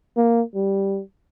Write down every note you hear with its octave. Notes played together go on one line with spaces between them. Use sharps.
A#3
G3